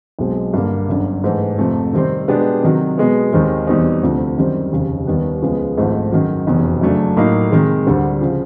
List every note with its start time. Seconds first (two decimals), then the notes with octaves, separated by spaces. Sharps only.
0.19 B1 B2 G#3 C4
0.54 G2 D3 G3 A#3
0.89 G1 F#2 D3
1.24 G#2 E3 A3
1.58 F2 C3 F3 A3
1.93 C3 D#3 G3 C4
2.28 B2 G#3 B3 D4 G4
2.63 C3 D#3 F#3
2.98 B2 G#3 B3
3.33 D#2 D#3 G#3 C4
3.67 E2 B2 G3 C4 D#4
4.03 D2 C3 F3 A3
4.37 F#2 D#3 G3 C4
4.72 F1 D#2 C#3
5.07 D#2 D#3 G3 B3
5.42 C#2 C#3 F3 G#3 B3
5.77 G#1 G#2 F3 A3
6.12 F#2 D#3 F#3
6.47 F1 E2 B2
6.81 F#2 C#3 F#3 A3 D4
7.17 A2 F#3 A#3 D#4
7.51 C3 D#3 G#3
7.86 D2 D3 G3 C4
8.21 C#3 F3